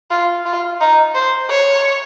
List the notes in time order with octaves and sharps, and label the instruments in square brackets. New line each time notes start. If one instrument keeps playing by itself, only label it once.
[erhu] F4
F4
D#4
C5
C#5